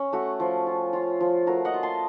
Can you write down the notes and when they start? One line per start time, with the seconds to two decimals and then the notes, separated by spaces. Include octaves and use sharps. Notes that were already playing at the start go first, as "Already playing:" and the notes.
Already playing: C#4
0.13 A3 F#4
0.40 F3
0.67 F4
0.93 F4
1.20 F3
1.47 A3 F#4 A#4
1.65 D#5 F#5
1.74 F4
1.83 A5 C6